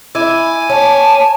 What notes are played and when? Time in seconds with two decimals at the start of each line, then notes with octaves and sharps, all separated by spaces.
0.15 E4 G#5 D6 G#6
0.70 C#5 A5